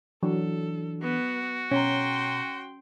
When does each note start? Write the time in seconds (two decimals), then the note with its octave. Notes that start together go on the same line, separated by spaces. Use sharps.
0.23 E3 F#3 D4 A4
1.01 B3 F#4
1.72 B2 C#4 G5 A#5 C6